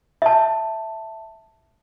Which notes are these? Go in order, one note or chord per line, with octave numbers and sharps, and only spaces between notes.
E5 A5